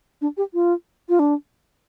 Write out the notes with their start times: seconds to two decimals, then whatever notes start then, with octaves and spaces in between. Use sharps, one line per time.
0.21 D4
0.37 G4
0.54 F4
1.09 F4
1.19 D4